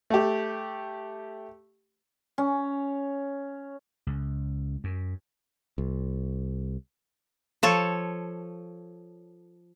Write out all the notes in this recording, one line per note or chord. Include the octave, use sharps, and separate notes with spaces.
A3 G4
C#4
C#2
F#2
C2
F3 A4 C#5